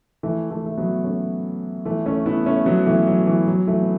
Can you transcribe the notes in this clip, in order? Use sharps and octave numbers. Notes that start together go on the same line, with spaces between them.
E3 A3
E3 A3
A3
F#3 B3
A3 C#4
E3 A3
A3 C#4
B3 E4
A3 C#4
F#3 B3
E3 A3
F#3
E3
F#3
E3 A3
B3